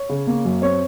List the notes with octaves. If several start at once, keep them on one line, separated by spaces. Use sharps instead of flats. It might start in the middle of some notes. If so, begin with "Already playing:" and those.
Already playing: C#5
C#3
A#3
F#2
C4 C#5